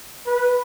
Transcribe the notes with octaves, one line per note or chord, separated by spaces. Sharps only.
B4